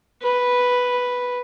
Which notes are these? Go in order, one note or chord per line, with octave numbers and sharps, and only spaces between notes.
B4